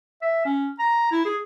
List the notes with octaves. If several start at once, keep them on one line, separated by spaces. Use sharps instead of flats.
E5
C#4
A#5
E4
G#4